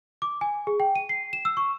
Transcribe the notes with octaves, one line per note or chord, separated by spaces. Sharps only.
D6
G#5
G#4
G5
D#7
C7
E7
E6
C#6